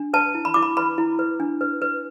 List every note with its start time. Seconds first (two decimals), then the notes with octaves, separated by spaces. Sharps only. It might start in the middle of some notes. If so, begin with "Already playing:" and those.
Already playing: D4
0.13 B4 A5
0.35 E4
0.45 B5
0.54 E4 D6
0.63 B5
0.77 B4 B5
0.98 E4
1.19 B4
1.40 D4
1.61 B4
1.82 B4